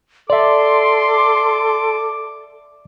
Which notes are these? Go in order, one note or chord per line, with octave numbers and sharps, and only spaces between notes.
A4 D5 E5 C6 D6